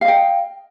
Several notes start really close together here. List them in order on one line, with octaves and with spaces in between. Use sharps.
F5 D#5 G5